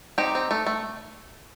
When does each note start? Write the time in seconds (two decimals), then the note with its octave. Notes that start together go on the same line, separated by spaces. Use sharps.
0.18 C4 D#4 G4
0.35 C4
0.51 A3
0.67 A3